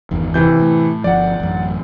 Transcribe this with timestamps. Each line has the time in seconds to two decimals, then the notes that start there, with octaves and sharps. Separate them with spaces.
0.11 G1 E2 D#3
0.34 C3 E3 G6
0.60 A2
1.04 G1 F3 D5 F#5
1.40 A1 F#2